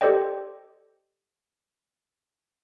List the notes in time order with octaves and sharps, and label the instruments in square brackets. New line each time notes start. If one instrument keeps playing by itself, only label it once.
[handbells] G4 A4 C5 D5 D#5 G5